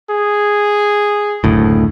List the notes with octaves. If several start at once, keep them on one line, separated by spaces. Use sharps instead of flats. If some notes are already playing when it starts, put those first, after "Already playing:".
G#4
F#1 D2 A2